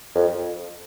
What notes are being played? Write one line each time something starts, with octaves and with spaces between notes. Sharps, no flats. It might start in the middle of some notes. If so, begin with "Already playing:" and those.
F2